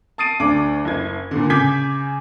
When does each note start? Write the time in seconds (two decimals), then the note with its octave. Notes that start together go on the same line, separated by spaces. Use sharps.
0.18 A5 D#6 A6 C7 D7 D#7
0.40 D2 D4 D6
0.85 F#1 E4 G#6
1.31 A#2 D3
1.50 C#3 G#5 D6 G6 G#6 B6